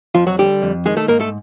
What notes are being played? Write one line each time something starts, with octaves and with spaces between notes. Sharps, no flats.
F2 F3 F4
F#3 F#4
D3 G3 G4
F2
D#3 G#3 G#4
A3 A4
G#2 A#3 A#4
A3 A4